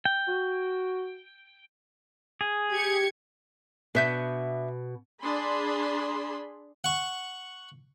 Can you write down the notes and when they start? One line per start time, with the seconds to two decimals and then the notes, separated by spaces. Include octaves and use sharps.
0.05 G5
0.28 F#4
2.41 G#4
2.71 G4 G#6 C#7
3.95 B2 B3 D4 E5 G6
5.22 D4 G#4 B5 C6
6.84 F#5 C#6